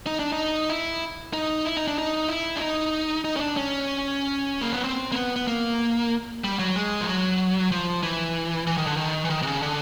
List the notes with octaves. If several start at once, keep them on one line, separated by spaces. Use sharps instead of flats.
D#4
D4
D#4
E4
D#4
E4
D#4
D4
D#4
E4
D4
D#4
D#4
C#4
D4
C#4
A#3
B3
C4
A#3
B3
B3
A#3
G3
F#3
G#3
F3
F#3
F3
E3
E3
D#3
D3
D#3
E3
D#3
C3
C#3
D3